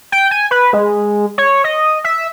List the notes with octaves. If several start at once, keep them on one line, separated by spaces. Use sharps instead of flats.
G5
G#5
B4
G#3
C#5
D#5
E5